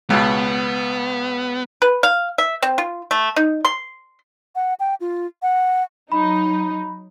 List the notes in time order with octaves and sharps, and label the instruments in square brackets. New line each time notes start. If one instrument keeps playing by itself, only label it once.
[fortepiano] C#2 B2 [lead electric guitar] B3
[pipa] B4
F5
E5
C4
F4
A3
D#4
C6
[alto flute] F#5
G5
F4
F#5
[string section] F#3 D#4 [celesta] B5